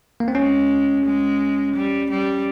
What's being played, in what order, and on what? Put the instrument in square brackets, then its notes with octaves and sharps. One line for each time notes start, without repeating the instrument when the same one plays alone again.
[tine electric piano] A#3
C4
[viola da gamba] G#3 [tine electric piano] C#4
[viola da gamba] G#3
G3
G3